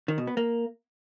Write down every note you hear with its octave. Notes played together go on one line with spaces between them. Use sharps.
D#3
B2
B3
A#3